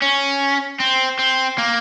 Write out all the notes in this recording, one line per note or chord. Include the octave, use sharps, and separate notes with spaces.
C#4
C4
C4
A#3